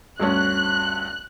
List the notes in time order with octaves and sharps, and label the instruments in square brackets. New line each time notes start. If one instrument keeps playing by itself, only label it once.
[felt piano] D2 G2 C#4 [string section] F#6